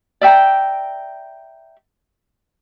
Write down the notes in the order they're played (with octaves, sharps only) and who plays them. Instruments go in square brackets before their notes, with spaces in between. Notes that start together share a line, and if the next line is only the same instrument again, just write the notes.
[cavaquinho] D5 E5 G5 A#5